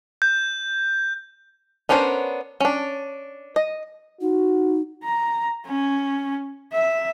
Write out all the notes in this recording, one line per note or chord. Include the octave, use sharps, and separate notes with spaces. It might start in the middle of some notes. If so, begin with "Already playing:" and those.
G6
B3 C#4 D4 A#4 C5
C#4 D4
D#5
D#4 F#4
A#5
C#4
E5